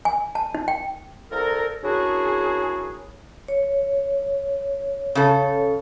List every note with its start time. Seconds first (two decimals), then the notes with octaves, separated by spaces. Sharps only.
0.05 G#5
0.35 A5
0.55 D#4
0.68 G5
1.32 C2 A4 A#4
1.83 A#3 C#4 D4 E4 F#4 G#4
3.48 C#5
5.15 C#3 A4